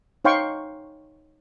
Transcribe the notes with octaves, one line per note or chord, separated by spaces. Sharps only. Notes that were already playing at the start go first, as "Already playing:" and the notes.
D#4 C#5 F5 G5 C6 C#6